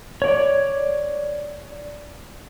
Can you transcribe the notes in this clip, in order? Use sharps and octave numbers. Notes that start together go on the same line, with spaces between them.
C#5 D5